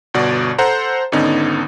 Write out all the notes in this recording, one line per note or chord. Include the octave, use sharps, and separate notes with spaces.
G1 B2 F#4 D5
A4 C5 F#5 A#5
G#1 D3 B3 C#4 D#4